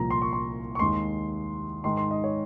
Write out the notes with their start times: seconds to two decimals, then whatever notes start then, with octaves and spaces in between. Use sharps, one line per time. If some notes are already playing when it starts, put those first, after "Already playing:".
Already playing: C2 A#2 F3 A#5
0.10 C6
0.22 C#6
0.33 C6
0.75 C#6
0.79 D#2 D#3 G#3 C6
1.84 G#2 D#3 G#3 C6
1.97 C6
2.11 D#5
2.24 C#5